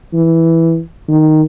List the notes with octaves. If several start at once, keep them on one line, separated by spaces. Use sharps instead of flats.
E3
D#3